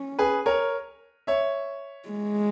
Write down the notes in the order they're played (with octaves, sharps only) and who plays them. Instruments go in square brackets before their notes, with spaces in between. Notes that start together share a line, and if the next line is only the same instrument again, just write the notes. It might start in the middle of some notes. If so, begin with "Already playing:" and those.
Already playing: [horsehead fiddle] C#4
[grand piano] G#4 B4
A#4 C#5
C#5 E5
[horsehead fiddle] G#3